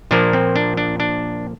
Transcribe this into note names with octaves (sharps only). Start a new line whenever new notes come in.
A#2 F3 A#3 D4
C4
D4
D4
D4